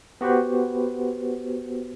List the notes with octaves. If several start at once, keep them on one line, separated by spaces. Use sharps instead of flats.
B3 F#4 G4 B4 C5